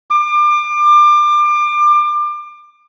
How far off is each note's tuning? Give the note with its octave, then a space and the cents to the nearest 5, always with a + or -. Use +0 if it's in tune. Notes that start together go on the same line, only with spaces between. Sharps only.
D6 +30